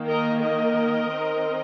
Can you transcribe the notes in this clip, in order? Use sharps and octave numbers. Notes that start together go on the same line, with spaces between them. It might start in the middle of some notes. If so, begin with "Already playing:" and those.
Already playing: D#3 A#3
A#4 D#5
A#4 D#5
D#3 C4